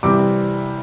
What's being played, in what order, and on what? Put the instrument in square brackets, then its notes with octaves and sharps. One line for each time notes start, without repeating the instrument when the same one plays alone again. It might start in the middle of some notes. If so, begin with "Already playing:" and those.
[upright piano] C3 E3 G3 C4 D6